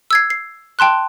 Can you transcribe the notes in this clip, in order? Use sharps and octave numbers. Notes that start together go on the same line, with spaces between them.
E6 G#6 C7
C7
G5 A5 C6 F#6